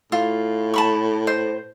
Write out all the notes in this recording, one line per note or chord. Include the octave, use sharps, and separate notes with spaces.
A2 F4
A5 B5 C#6
C5